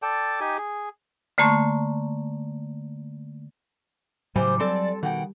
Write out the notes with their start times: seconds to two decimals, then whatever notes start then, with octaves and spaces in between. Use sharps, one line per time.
0.02 A4 D5 G5 A5
0.40 D#4 G4 G#5
0.58 G#4
1.38 D3 A3 A#3 A5 C6 C#6
4.36 A2 C#3 E3 F#3 G3 C5 G#5
4.60 G3 C4 A4 D5
5.03 B2 D#3 F#5 G5